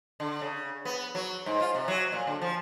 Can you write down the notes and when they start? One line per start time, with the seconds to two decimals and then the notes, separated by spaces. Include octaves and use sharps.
0.20 D3
0.41 C#3
0.85 B3
1.15 F#3
1.46 G#2
1.61 F4
1.75 C3
1.88 F#3
2.12 A#2
2.27 D3
2.42 F3